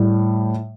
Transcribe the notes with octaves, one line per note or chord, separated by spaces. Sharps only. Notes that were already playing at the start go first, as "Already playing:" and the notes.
Already playing: A2 G3